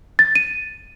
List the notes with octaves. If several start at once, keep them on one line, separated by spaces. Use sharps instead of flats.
A6
D#7